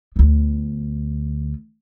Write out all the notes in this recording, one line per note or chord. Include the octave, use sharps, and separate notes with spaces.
D2 B3